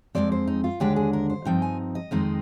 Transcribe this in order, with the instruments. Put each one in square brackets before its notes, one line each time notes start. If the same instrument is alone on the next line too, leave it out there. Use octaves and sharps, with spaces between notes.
[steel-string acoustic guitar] F2 D#3 G#3 C4 D5
C5
D#4
F4
D#2 D3 G#3 D4 G4
G#4
A#4
C5
G2 F3 C4 D#4 G5
G#5
D#5
F2 D#3 G#3 C4 D#4